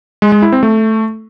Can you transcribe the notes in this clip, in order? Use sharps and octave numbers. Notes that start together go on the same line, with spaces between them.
G#3
G#3
E4
C4
A3